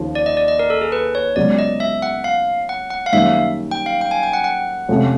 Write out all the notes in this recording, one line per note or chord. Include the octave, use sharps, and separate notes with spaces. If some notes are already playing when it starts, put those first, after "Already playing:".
Already playing: D#2 C#3 F3
D5
D#5
D5
D#5
A#4
A4
G#4
B4
C#5
C#2 C#3 F#3 B3 D5
D#5
E5
F#5
F5
F#5
F#5
F5
F#2 D#3 G3 A#3 E5
G5
F5
G5
G#5
G5
F#5
F#5
F2 C3 F3 A3 C#4